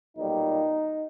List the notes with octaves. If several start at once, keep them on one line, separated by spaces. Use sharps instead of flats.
B1 A#2 G3 D#4